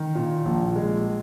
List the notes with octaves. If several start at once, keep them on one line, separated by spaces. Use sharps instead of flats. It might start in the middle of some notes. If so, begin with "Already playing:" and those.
Already playing: D#3
A#2
A#1
G#3